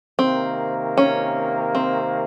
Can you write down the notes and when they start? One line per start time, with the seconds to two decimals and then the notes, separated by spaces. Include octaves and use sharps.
0.18 C3 D#3 A#3 C4
0.97 C#4
1.75 C4